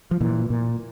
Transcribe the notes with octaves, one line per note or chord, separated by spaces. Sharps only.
F3
A#2 E3
A#2